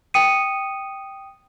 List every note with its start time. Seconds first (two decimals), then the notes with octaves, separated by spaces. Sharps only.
0.14 G5 D#6 C#7 D#7